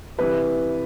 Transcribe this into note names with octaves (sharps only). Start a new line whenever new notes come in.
C3 E3 G3 B4